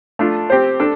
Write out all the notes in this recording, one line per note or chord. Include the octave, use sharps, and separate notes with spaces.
A3 D4 F4
C4 G4 C5
D4 A4